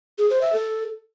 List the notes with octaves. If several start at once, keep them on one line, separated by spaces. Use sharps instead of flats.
G#4
C5
E5
A4